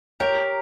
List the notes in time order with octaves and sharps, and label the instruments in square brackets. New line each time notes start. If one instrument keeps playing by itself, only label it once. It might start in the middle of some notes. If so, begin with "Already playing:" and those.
[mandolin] G4 A#4 [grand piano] C#5